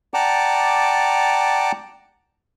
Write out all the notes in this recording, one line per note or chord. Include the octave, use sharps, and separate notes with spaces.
D5 F#5 G5 A5 A#5 D6